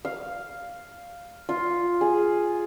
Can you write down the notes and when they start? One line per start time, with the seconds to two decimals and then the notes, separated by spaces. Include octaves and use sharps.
0.05 F5
1.49 F4
2.01 G#4